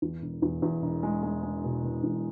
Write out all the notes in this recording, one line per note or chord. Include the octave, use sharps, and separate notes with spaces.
E2
E1
E2
E2
E1
G#3
G#3
G#3
B2
B2
E2